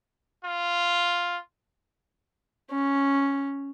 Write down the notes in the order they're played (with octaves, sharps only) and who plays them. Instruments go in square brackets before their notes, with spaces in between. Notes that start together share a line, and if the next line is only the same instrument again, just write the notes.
[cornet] F4
[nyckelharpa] C#4